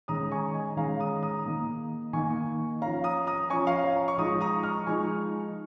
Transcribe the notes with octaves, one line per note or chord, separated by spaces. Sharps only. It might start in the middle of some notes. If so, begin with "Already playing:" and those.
D#3 G#3 C#4 A#5 D#6
G#5 C#6
D#5 G#5
D#3 G#3 C#4 F5 A#5
A#5 D#6
A#5 D#6
D#3 A#3 D#4
D#3 A#3 D#4 G#5 C#6
F3 C#4 F5 A#5
A#5 D#6
A#5 D#6
F3 C#4 G#5 C#6
F5 A#5
C#5 F5
C#6
F3 G#3 D#4 A#5 D#6
A#5 D#6
C#6 F6
F3 G#3 D#4 G#5 C#6